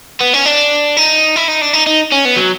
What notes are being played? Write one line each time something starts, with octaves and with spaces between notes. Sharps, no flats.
B3
C#4
D4
D#4
E4
D#4
D4
D#4
D#4
C#4
B3
F#3